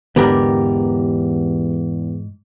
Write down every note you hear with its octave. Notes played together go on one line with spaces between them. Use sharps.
E2 G#2 D3 E3 B3 G4 A#4 D5